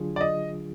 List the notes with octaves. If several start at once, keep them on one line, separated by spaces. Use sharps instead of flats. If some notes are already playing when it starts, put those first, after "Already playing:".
Already playing: D3 F#3 D4 F4 G#4
D5
D#5